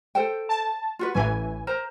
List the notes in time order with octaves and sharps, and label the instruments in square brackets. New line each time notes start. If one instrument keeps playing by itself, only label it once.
[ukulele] A4 C5 G5
[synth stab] A5
[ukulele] F4 F#4 B4
[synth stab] A1 E3 G#5 [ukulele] C#4
[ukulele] A#4 C5 A#5